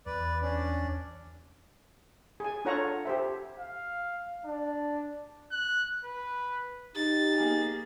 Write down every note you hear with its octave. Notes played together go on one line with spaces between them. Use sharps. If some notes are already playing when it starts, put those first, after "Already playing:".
E2 B4 D5
C#4 D4 D5
G#4 G#5
D4 F4 A4 C#5 F#5 A#5
G4 C5 E5
F5
D4
F#6
B4
D#4 G4 A6
A#3 G#4